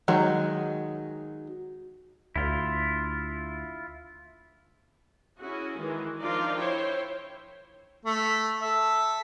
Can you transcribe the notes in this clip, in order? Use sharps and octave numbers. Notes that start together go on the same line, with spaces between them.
D#3 F#3 G#3
D2 E4 F4
C#4 E4 F#4 G#4
D#3 E3 G#3
F3 D4 D#4 F4 A#4 D5
E4 C5 C#5 G5
A3
A4 E5